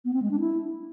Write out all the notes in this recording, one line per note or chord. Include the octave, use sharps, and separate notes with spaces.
B3
C4
G#3
D4
E4